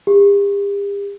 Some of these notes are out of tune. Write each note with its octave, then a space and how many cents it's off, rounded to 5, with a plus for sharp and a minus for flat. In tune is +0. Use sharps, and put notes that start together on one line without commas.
G4 +40